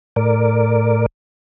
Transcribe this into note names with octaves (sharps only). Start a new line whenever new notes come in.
A2 A#4 D5